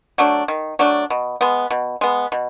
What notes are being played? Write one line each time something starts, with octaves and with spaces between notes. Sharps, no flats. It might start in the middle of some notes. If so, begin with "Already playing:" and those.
F#3 A3 D4
D#3
F#3 A3 D4
B2
G#3 B3
B2
G#3 B3
B2